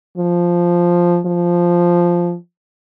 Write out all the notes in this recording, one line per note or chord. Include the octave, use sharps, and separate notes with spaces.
F3
F3